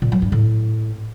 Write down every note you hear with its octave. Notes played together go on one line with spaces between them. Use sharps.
A#2
F#3
G2
A2